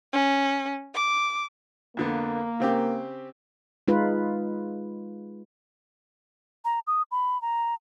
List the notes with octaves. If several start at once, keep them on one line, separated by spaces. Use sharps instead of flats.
C#4
D6
F2 D3 A#3 B3
C#3 C4 G4
G#3 D#4 F4 B4
A#5
D#6
B5
A#5